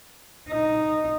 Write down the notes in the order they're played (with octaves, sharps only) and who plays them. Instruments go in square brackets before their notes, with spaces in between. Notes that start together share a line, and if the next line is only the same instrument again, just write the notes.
[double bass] D#4